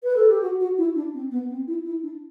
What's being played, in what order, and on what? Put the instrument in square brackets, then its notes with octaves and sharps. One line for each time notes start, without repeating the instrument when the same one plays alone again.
[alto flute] B4
A4
G4
F#4
F#4
E4
D4
C4
B3
C4
E4
E4
D4